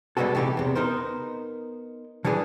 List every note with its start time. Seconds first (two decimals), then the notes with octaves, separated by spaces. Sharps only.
0.17 B2 G3 G#3 B3 F#4 A4
0.35 C3 E3 G3 A3 G4
0.57 E2 C3
0.75 B3 D#4 A#4 C5
2.24 D3 E3 G3 D4 G#4 B4